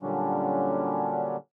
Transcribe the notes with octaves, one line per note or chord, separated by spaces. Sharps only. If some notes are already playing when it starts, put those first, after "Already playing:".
A#2 D3 F#3 G3 C#4 D4